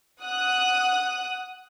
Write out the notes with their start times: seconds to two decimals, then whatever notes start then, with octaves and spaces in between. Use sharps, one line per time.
0.22 F#5 D#6 F#6